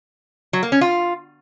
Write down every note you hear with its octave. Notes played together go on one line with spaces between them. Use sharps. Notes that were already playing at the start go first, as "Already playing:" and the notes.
F#3
A#3
C#4
F4